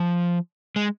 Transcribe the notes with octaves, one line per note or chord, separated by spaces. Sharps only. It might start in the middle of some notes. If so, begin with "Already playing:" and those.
Already playing: F3
G#3